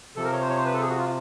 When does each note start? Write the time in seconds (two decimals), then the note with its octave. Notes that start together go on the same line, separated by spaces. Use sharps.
0.16 C3 F3 A4
0.24 A#4
0.33 C#5
0.41 C5
0.49 C#5
0.57 C5
0.66 B4
0.73 A4
0.81 G#4
0.89 F#4
0.98 F4